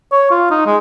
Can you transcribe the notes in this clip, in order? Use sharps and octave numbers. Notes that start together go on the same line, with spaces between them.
C#5
F4
D#4
G#3